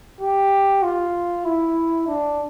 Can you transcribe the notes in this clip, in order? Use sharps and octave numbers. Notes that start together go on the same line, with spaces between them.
G4
F4
E4
D4